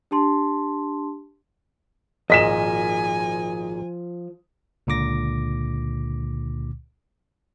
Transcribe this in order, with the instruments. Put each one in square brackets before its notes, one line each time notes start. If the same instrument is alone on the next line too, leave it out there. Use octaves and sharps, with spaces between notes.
[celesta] D4 G4 A5 C6
[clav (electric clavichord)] G#1 A#2 [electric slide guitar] F3 [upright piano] D#5 B6 E7 [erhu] G#5
[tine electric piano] C#2 A#2 D3 D6 A#6